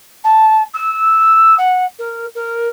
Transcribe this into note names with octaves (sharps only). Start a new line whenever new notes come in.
A5
E6
F#5
A#4
A#4